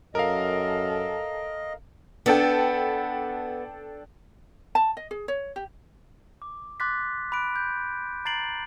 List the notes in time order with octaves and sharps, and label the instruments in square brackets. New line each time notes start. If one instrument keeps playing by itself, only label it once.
[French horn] F#2 [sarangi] A4 [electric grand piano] A#4 F5 [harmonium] D#5
[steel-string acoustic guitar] B3 [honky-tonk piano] D4 A4 G5
[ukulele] A5
D#5
G#4
C#5
G4
[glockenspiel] D6
C6 D6 F#6 A6 B6
B5 D6 F#6 D7
G6
A#5 A6 C7 D7 F#7